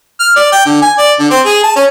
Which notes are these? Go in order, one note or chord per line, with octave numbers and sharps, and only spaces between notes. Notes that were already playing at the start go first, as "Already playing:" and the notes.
F6
D5
G5
D3
G#5
D5
D3
C4
G#4
A5
C#4